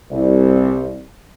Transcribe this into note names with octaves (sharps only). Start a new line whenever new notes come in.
C2